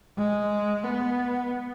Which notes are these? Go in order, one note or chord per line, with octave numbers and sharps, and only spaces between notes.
G#3
B3